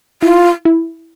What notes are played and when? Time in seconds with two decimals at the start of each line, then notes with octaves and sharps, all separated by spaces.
0.22 E4 F4
0.65 E4